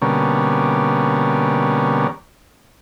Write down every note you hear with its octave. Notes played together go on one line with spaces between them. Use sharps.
B2 D3 G3 A#3 C#4